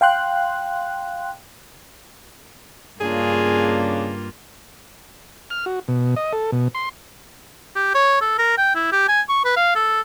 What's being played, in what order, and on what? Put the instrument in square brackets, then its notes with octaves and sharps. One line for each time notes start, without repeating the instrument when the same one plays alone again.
[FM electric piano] F5 G5 C6 F#6
[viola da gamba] G2 A#3 F4 [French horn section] C#3 D4 [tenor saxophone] G#4
[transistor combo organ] F6
F#4
B2
D#5
A4
B2
C6
[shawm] G4
C#5
A4
A#4
G5
E4
G4
G#5
C#6
B4
F5
A4